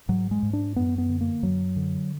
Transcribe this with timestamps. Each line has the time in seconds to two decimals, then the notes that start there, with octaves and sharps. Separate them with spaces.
0.09 G#2 F#3
0.31 G#3
0.43 G#2
0.53 D4
0.76 F#2 B3
0.98 B3
1.09 D3
1.21 A#3
1.43 F#2 F#3
1.76 D3